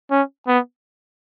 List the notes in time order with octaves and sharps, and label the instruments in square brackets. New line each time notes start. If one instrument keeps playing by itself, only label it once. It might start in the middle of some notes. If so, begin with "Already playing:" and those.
[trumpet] C#4
B3